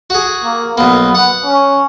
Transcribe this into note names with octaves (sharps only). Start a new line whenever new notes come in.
F#4 G#4
A#3
B1 A#3 B3
F#5
C#4